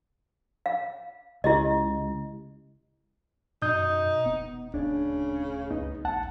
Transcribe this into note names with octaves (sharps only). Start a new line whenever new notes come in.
F5
C#2 E4 G4 D#5
F#2 B2 D#4 D#6 G6
D#1 B3
D#1 D2 C#3 D4
C#2 B3 D#4
A1 F#5 A5